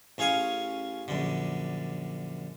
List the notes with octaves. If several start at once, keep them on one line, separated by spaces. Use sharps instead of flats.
A1 C#4 G#4 F5 G#5 C#6
A#1 F#2 D3